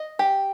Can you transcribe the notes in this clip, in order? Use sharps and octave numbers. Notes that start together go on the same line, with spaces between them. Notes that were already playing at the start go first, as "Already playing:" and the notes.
Already playing: D#5
G4